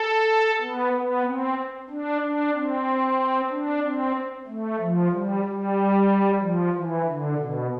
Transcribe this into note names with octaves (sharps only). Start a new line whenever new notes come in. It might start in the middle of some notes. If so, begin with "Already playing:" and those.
Already playing: A4
B3
B3
C4
D4
D4
C4
D4
C4
A3
F3
G3
G3
F3
E3
D3
B2